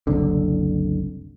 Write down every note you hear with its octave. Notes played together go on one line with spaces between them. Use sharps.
F#1 C2 D3